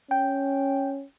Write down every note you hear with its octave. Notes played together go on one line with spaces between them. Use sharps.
C#4 G5